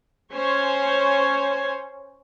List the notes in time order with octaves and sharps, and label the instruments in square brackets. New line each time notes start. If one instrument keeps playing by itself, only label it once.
[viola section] C#4 C5 C#5